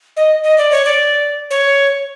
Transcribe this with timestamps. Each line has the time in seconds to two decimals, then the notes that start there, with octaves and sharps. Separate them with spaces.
0.16 D#5
0.43 D#5
0.58 D5
0.71 C#5
0.85 D5
1.50 C#5